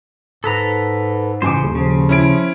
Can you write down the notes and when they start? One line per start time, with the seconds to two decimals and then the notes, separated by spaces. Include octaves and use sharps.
0.44 G#2 A4 B4 A#5
1.42 A1 C#3 C5 G#5 D6
1.61 D#1
1.75 C#3 F3
2.09 C#4 E4 D7